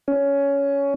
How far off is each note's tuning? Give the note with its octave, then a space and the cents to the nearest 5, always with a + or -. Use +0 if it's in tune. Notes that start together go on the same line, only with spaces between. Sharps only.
C#4 +15